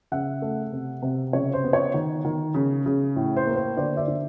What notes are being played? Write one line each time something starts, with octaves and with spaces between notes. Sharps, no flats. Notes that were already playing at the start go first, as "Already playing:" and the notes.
C#3 E5 F#5
A3
C3
C3
C#3 C#5
C5
B3
C#5
D#3
D#3
C#3
C#3
A2
C5
A#3
C5
D3 C5 D5
D5 E5
D3